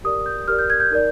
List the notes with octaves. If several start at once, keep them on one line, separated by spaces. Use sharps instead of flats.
G4 A#4 D5 D#6
G6
G4 A#4 D5 F6
G6
G#6
G6
D#4 A#4 D5